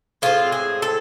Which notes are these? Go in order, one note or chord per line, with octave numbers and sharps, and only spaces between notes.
A2 G#3 C4 F4
G#4
A4